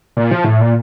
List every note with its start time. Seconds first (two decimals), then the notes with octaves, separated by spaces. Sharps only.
0.17 A#2
0.31 F3
0.44 A2
0.61 A#2